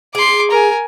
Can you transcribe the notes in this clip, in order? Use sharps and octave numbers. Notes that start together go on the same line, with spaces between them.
G#4 C6 D6
A#4 G#5